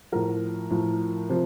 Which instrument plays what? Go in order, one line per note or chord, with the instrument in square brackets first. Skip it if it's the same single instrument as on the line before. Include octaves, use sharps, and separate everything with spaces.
[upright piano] A2 F3 A#4
A2 F3
C3 F3 C5